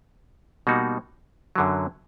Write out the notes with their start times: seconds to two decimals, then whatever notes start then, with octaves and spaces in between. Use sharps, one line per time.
0.67 B2 G3 A#3 D#4 F#4
1.56 F#2 D3 F#3